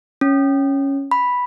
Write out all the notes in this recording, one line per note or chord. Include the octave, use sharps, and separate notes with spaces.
C#4
B5